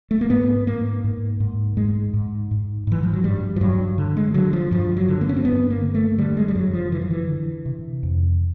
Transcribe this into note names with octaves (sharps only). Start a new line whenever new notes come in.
A3
A#3
G#2 B3
G#2 A#3
G#2
G#2
G#2 G#3
G#2
G#2
G#2 E3
F3
F#3
G2 G3
F3
G2 F#3
D3
G#3
D3 F#3
F3
G2 F3
F#3
D3
A#3
C#4
C4
G2 B3
A#3
D3
A3
D3 G3
G#3
G3
F#2 F#3
F3
D3 E3
F3
E3
D3
C3
F2